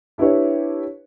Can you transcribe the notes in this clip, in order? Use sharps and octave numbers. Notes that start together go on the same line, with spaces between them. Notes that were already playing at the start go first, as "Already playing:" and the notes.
D4 E4 G4 B4 C#5